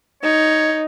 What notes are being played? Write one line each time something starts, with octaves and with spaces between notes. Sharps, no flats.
D#4 C#5